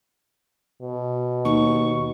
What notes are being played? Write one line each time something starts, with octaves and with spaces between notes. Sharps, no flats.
B2
D#2 C#6